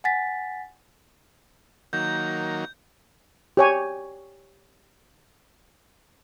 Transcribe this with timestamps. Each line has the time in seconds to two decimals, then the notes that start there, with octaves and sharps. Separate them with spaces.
0.04 F#5 G#5 A6 B6
1.93 D#3 F#3 A#3 G6
3.57 G4 C#5 G#5